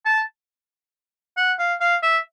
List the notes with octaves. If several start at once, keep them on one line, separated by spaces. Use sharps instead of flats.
A5
F#5
F5
F5
E5